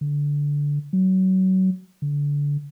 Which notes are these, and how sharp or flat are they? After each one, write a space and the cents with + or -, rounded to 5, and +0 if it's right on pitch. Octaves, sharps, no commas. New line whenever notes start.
D3 -15
F#3 +25
D3 -25